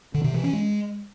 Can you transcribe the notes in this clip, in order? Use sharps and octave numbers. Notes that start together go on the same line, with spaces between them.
D3
C3
E3
C#4
G#3